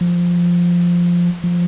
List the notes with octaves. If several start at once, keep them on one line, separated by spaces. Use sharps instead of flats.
F3
F3